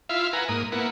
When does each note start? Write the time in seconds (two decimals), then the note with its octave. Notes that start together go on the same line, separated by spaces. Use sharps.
0.09 E4 F4 E5 F5
0.33 E4 B4 F#5 G#5 A#5
0.49 G#2 A#3 D#6
0.72 A#3 B3 E4 F#5